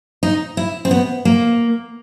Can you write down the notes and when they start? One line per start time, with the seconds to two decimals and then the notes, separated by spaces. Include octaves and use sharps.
0.23 D#4
0.57 E4
0.85 C4
0.91 B3
1.25 A#3